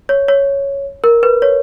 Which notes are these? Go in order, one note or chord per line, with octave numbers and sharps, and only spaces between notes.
C#5
C#5
A#4
B4
C#5